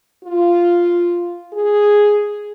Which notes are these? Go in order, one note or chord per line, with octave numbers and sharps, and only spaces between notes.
F4
G#4